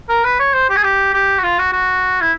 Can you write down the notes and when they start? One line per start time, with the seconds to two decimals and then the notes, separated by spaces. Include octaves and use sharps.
0.09 A#4
0.24 B4
0.40 C#5
0.54 C5
0.70 G4
0.77 G#4
0.84 G4
1.14 G4
1.39 F#4
1.43 F4
1.59 F#4
1.73 F#4
2.21 E4